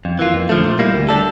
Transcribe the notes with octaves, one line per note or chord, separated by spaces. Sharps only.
F2
E3 A#3 F4
F2
D3 F3 A3
A#2
G3 A#3 E4
D2
D3 G3 D4 A4